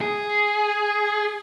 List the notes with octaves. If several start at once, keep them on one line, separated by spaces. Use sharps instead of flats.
G#4